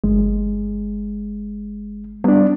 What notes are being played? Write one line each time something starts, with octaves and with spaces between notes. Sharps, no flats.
G1 G#3
G3 B3 D4